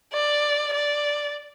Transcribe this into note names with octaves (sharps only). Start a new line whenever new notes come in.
D5
D5